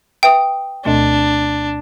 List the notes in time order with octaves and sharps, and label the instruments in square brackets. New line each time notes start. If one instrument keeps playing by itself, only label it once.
[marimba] B4 E5 [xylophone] G5 D#6
[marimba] D2 B2 A3 [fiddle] D4